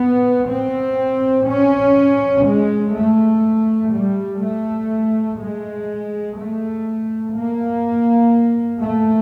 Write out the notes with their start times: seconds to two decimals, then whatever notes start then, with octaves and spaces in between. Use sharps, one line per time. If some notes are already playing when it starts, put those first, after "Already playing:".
Already playing: B3
0.49 C4
1.47 C#4
2.45 G#3
2.94 A3
3.93 G3
4.41 A3
5.39 G#3
6.37 A3
7.36 A#3
8.82 A3